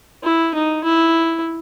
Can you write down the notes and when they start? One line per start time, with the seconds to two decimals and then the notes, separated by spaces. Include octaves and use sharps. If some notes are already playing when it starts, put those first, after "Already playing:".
0.24 E4
0.55 D#4
0.84 E4